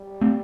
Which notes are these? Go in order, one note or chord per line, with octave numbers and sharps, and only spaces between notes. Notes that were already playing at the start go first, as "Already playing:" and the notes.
Already playing: G3
A3 C4